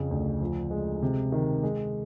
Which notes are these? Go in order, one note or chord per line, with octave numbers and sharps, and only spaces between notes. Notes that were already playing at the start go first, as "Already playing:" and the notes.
Already playing: F2 C#3
D2
F3
G#3
C3
D#3
G#3